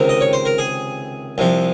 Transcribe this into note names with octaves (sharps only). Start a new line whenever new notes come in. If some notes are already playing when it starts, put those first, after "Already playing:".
Already playing: C#2 C3 D#3 A#4
D#5
C#5
C5
A#4
G#4
C2 C3 F3